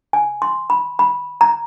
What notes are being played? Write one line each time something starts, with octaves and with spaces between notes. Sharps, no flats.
G#5
C6
B5
B5
A#5